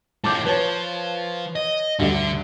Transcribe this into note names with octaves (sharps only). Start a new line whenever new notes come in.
A2 F3 A5 D6 G6
F3 B4 C#5 A5
D#5
D2 G2 D3